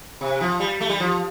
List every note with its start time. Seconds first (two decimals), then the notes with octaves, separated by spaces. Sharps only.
0.21 C3
0.41 F3
0.60 G3
0.81 A3
0.90 G3
1.00 F3